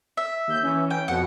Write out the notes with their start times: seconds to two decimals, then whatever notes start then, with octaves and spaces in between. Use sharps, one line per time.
0.17 E5
0.47 D#2 G6
0.63 E3 C#4
0.90 G5
1.08 F2 B2 F#5